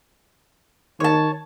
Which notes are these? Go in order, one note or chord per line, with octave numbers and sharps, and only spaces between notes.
D#3 C#5 A5